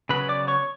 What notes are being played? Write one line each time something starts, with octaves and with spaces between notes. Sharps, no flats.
C#3 F#3 B3 B4 B5
D5 D6
C#5 C#6